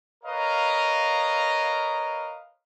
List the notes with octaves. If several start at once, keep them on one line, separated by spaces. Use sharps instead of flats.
A#4 B4 C#5 D#5 F5 A#5